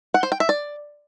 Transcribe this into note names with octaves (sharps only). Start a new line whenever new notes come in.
F#5
C5
G5
E5
D5